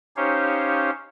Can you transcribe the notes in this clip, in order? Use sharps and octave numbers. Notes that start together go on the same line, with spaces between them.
C#4 D#4 G4 C5 C#5 F5